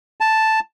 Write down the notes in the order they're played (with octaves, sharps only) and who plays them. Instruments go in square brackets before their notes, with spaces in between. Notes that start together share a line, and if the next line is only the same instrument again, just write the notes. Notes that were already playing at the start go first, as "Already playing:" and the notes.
[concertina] A5